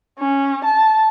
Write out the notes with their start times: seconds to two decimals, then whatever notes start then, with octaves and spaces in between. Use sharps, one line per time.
0.19 C#4
0.65 A5